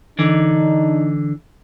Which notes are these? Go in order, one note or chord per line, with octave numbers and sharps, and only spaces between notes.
D3 E3 D4 D#4